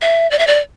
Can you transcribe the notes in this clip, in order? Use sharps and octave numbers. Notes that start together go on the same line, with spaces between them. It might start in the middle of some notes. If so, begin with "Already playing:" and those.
E5
D5
E5
D5